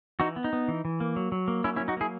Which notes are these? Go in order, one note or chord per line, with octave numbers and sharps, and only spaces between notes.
E3 D#4 F#4
B3
D#4
B3
E3
E3
A#3
F#3
F#3
A#3
F#3 C#4 E4
C#4 E4
F#3
D#4 F#4
A#3 E4 G#4